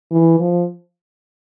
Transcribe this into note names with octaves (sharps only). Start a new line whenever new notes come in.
E3
F3